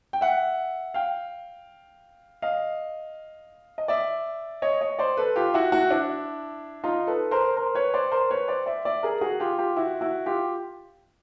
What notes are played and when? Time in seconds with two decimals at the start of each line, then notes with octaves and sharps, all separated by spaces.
0.13 G5
0.21 E5 F#5
0.94 F5 G5
2.42 D#5 F5
3.78 D#5
3.88 D5 E5
4.62 C#5 D#5
4.81 C#5 D#5
4.99 C5 D5
5.17 A4 B4
5.36 F4 G4
5.54 E4 F#4
5.72 E4 F#4
5.91 D4 E4
6.84 D#4 F4
7.07 A4 B4
7.31 A#4 C5
7.57 A#4 C5
7.75 B4 C#5
7.94 C5 D5
8.12 A#4 C5
8.31 B4 C#5
8.48 C5 D5
8.66 D5 E5
8.85 D5 E5
9.03 G#4 A#4
9.21 F#4 G#4
9.40 F4 G4
9.58 F4 G4
9.76 E4 F#4
10.01 E4 F#4
10.26 F4 G4